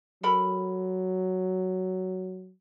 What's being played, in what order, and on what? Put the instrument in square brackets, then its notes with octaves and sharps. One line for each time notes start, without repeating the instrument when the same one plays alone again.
[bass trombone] F#3 [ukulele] A4 A#4 B5